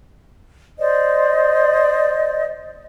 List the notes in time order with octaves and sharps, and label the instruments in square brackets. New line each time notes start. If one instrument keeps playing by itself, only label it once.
[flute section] C5 D5 D#5